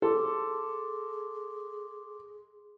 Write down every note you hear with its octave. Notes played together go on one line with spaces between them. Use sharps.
G#4 A4 C6 D6